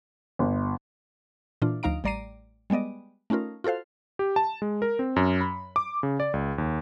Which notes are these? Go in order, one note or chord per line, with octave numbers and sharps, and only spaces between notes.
G1
A#2 E3 D4 F4
D2 F3 D#4 F5 A#5 D7
A1 G3 D5 A#5 C7 D#7
G3 G#3 B3 D5 D#5
A3 C#4 D#4 F4 A#4
F4 F#4 A4 C5 F5
G4
A5
G#3
A#4
C4
F#2
B5
D6
C#3
D5
C#2
D#2